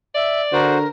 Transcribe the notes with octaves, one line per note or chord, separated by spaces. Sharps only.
D5 E5
D3 F#4 A#4 C5